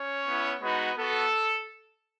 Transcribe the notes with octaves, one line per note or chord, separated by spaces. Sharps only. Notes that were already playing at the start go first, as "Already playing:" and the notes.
Already playing: C#4 C#5
B3 E4
G#3 B3 D#4 F#4 B4
B3 F#4 A4